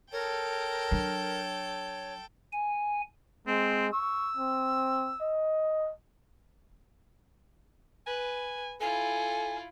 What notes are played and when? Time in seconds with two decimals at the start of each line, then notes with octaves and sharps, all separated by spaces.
0.12 A4 A#4 C#5 G5
0.91 F#3 D4
2.52 G#5
3.47 G#3 C4
3.93 C#6 E6
4.37 C4
5.21 D#5
8.06 B4 G#5
8.81 E4 F4 A4 G#5